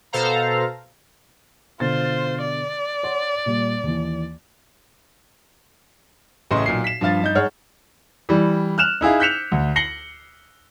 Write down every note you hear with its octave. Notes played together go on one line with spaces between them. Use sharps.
B2 A4 C5 F5 A#5
B2 D3 F4 C5 A6
D5
C#5 F#5 C6
A#2 G3
D#2 E3
A1 A2 C#3 D#5 C6
B1 A#2 C7
B6 E7
G2 F3 F5 A6
G2 D#4 G6
G#2 G#4 C#5 F#5 F6
E3 G3
F6 F#6 E7 F7
D#4 E4 G#4 F5
F#6 G6 B6 C#7 E7 F7
D2
A#6 C7 C#7 F#7 G7